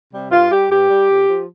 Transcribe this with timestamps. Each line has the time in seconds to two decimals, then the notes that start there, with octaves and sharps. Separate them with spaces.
0.12 C3 G3
0.31 G2 F4
0.51 G3 G4
0.71 G2 G4
0.90 G3
1.10 F2
1.29 F3